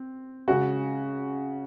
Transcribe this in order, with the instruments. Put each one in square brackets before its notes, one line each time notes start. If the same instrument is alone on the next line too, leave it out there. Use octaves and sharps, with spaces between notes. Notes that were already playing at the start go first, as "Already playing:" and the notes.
Already playing: [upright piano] C4
C#3 G#3 C#4 F#4